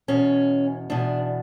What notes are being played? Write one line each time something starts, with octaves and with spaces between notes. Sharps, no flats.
E2 B2 C#4
E2 B2 D4